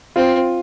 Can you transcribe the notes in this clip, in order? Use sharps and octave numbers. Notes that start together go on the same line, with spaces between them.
C4 F4